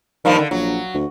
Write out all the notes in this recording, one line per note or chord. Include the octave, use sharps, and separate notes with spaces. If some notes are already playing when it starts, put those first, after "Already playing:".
G2 D#3 F3 A#3
D3
A#1 F#3
D2